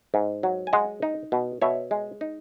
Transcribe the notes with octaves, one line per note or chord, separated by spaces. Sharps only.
G#2
F#3
G#5
G#3 D#5 F#5
D#4
B2
B2 C#5 E5
G#3
D#4